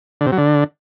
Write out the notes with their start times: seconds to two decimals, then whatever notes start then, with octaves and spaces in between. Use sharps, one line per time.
0.21 D3
0.26 C3
0.32 F#3
0.38 D3